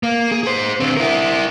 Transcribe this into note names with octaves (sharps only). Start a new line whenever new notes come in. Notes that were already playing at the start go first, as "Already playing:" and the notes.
A#3
G#4
G#4 C5
D3 C4
E4 A#4